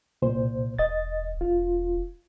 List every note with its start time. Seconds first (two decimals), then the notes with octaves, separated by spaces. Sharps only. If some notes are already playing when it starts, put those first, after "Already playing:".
0.22 C2 A#2 C5
0.79 E1 D#5 A6
1.41 E1 F4